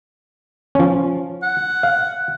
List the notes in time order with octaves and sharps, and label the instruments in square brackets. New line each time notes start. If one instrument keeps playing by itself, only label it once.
[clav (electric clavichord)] F3 C#4
[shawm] F#5
[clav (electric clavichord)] F5